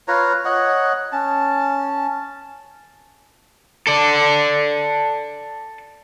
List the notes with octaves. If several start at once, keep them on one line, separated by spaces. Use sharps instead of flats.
F4 B4 C#5 A#5
C#5 D#5 F#5
C#4 A5
A4 D5